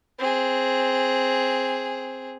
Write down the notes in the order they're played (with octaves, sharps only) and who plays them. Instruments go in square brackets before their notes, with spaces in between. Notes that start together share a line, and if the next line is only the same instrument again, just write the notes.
[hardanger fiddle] C4 G#4